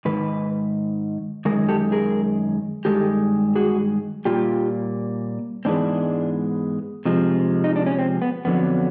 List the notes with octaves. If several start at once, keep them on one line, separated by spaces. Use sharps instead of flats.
G#2 D#3 B4
F#2 D#3 G#3 A#4
G4 A4
G#4 A#4
G2 D#3 G#3 G4 A4
F#4 G#4
A#2 G3 A#3 F4 G4
G#2 E3 G#3 B3 C4 D4
C3 F3 G#3
D#4
D4
C#4
C4
B3
F2 D3 F#3 B3